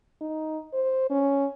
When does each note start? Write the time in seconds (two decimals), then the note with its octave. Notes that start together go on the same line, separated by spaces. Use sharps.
0.21 D#4
0.73 C5
1.10 C#4